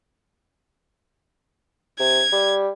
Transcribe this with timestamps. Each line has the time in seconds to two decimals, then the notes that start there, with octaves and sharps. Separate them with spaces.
2.00 C3 G#6
2.32 G3